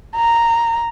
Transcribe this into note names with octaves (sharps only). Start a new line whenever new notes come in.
A#5